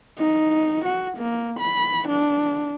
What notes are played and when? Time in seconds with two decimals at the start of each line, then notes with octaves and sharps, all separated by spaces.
0.19 D#4
0.85 F#4
1.17 A#3
1.60 B5
2.09 D4